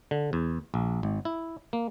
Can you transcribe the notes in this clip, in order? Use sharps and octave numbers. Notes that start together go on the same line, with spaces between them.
D3
E2
A#1
G#1
E4
A#3